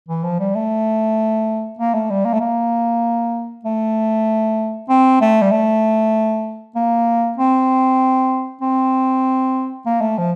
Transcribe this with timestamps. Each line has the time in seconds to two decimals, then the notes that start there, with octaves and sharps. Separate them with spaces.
0.09 E3
0.24 F3
0.39 G3
0.55 A3
1.79 A#3
1.94 A3
2.10 G3
2.25 A#3
2.33 A3
2.41 A#3
3.65 A3
4.89 C4
5.21 A3
5.42 G3
5.51 A3
6.75 A#3
7.38 C4
8.61 C4
9.86 A#3
10.01 A3
10.18 F3